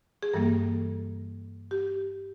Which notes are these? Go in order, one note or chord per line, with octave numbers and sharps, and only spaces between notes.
G#4
G2 E3 G3 A#3 A4
G4